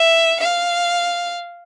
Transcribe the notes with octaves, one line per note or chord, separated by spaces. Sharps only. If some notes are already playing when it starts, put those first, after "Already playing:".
Already playing: E5
F5